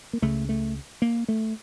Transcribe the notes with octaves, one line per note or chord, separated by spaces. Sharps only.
A#3
C#2 C#3 A3
A3
A#3
A3